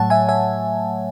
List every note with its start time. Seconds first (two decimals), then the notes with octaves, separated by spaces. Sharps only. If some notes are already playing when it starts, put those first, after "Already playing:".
Already playing: A2 F#3 A3 C#5 F#5 A5
0.10 E5 G#5
0.29 E5 G#5